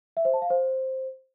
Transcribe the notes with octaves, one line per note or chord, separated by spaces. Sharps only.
E5
C5
A5
F5
C5